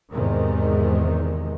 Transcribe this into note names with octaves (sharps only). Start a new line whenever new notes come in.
E2 G#2 C3 D#3